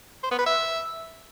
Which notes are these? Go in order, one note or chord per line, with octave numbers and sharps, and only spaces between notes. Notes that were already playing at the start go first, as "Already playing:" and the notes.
C5
B3
B4
E5